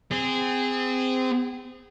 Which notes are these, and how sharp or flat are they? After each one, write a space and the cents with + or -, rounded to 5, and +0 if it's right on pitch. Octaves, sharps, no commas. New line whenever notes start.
C4 -25 G#4 -20